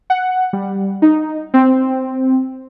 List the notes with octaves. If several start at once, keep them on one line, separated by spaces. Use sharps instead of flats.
F#5
G3
D#4
C4